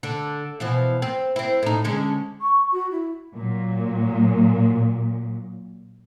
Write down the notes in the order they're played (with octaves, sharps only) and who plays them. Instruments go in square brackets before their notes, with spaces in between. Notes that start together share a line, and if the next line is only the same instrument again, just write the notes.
[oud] D3
B2 E3 F3
C4
C4 E4
A2 D#4
D3 G#3 C#4
[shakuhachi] C#6
F#4
E4
[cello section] A#2 F#3